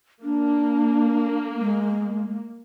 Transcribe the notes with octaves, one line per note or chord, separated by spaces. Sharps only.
A#3 D4
G#3